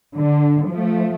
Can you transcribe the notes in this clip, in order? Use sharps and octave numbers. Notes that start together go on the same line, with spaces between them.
D3
F3 A3